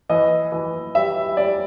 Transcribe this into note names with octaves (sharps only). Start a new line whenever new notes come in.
E3 D#5
E3
G3 E5
G3 D5